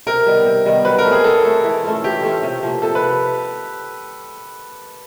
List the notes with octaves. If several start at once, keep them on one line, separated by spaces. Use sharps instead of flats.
C3 A#4
D#3 G3 B3
C3
D#3 G3 B3
F#3 B4
A#4
A3
C4 G#4
F#3 A4
A3 C4
E3
A3 C#4 F4
E3 G4
A3 C#4 F4
C3
F3 A#3
C3 A4
B4